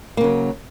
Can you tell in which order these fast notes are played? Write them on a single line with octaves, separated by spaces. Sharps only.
A#3 C#3 F#3